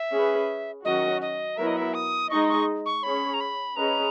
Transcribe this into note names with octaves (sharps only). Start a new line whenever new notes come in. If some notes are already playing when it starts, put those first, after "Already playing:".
Already playing: E5
C#4 G#4 B4
D#3 F#3 C#4 F#4 D#5
D#5
F#3 B3 E4 A#4 E5
D#5
E5
D#6
G#3 D#4 G#4 D#5 C#6
C#6
C#6
C#4 G#4 C#5 B5
A#5
B5
C#4 G#4 B4 D#5 A#5